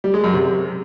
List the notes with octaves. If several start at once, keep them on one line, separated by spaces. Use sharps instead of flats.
G3
G#3
F#2
C3